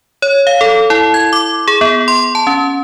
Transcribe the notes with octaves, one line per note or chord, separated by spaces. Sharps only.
C#5
F5
A4
E4
G#6
D6
G#4
B3
C6
A5
C#4